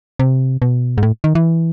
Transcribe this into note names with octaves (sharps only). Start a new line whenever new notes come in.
C3
B2
G#2
A2
D#3
E3